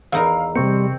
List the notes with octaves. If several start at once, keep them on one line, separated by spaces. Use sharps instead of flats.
E2 D#4 A#4 F5 E6
C3 G3 C4 C#6 C#7